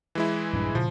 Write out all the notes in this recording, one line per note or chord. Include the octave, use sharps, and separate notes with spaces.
E3 G#3 E4
A#1 G2 D4
A#2 C#3 F3